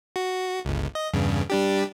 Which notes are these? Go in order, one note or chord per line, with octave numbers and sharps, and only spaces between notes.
F#4
G1 C#2
D#5
E2 G2 C#3
G3 D4 G4